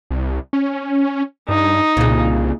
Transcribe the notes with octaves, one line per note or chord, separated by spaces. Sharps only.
C2
C#4
G2 D#4
C2 A#2 C#3